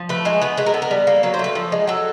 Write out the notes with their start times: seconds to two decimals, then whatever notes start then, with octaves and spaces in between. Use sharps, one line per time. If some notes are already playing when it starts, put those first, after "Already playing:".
Already playing: F3
0.09 A3 B4
0.25 G#3 A#4
0.41 B3 B4
0.57 G#3 B4
0.66 A#4
0.74 B3 A4
0.82 A#4
0.91 G3
1.07 A#3
1.23 F#3 B4
1.34 C5
1.39 A3 B4
1.55 F3 A4
1.72 G#3
1.87 F#3 A4